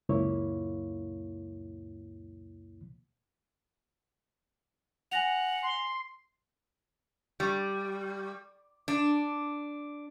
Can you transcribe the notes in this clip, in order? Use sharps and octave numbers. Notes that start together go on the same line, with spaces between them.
C#2 F#2 A#2 A#3 E4 C#5
F#5 G#5 A#6 F7
C6
G3
D4